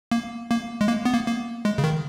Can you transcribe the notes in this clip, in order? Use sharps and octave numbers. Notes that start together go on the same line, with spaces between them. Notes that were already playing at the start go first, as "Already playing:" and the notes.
A#3
A#3
G#3
A#3
B3
A#3
A#3
G#3
C#3
D#3